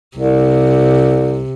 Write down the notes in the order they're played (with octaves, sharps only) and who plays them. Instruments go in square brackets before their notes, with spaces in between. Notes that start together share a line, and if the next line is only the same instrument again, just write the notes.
[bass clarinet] C2 [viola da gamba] C3